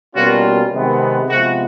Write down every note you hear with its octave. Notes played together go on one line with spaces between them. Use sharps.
B2 G3 A#3 C#4 F4 F#4
C3 D#3 G#3 B3
C3 F3 G#3 B3 F#4